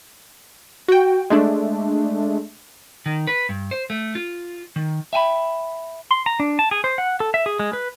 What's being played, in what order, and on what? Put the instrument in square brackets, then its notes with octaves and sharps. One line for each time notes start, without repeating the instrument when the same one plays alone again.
[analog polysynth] F#4 G5
G#3 A3 D4
[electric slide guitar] D#3
B4
G2
C5
A3
F4
D#3
[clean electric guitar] E5 G5 G#5 B5
[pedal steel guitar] C6
A#5
D4
A5
G#4
C5
F#5
A4
E5
G#4
G#3
B4